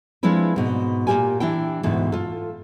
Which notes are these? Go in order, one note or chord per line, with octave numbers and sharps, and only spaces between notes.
F3 G#3 C4 D4 E4 B4
G#2 B2
A#2 D#3 G4 A#4 G#5
E3 D4 E4 G5
D2 G#2 B2 E3
F4 A4